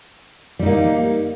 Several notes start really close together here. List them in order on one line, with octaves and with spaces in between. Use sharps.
G3 D#4 A#3